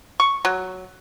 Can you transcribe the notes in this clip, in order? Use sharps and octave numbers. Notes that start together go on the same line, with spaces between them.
C#6
F#3